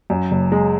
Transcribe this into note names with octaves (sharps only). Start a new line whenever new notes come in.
F#2
F#1
G#3